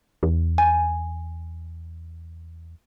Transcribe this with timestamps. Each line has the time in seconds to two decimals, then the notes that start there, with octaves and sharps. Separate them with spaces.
0.23 E2
0.58 G#5